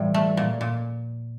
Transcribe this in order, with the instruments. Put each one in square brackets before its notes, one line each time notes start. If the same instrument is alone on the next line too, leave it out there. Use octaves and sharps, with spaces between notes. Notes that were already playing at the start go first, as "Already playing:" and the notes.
Already playing: [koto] A2 F3 [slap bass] E3 G3
[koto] A3
A#2
A#2